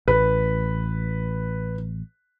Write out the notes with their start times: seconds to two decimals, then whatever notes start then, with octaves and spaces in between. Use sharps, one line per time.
0.08 A1 B4